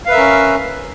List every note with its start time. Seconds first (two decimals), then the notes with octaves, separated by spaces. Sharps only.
0.06 F5
0.09 B4
0.11 E5
0.14 A#4
0.17 C#4